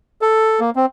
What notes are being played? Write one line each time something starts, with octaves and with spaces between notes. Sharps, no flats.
A4
A#3
C4